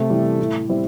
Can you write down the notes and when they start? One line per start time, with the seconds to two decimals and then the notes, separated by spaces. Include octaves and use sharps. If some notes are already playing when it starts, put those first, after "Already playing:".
Already playing: C3 A3
0.10 E3 G3
0.40 A2
0.69 G3 C4 E4